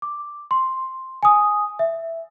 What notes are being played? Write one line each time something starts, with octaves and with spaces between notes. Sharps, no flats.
D6
C6
G#5 D#6
E5